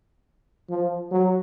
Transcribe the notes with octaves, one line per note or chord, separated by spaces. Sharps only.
F3
F#3